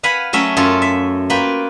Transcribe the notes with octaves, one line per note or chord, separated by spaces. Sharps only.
B4 F5 F#5 G#5 B5
F#3 A3 C#4 E5
F#2 F4 A4 F5
E5
A#3 F4 B4 G5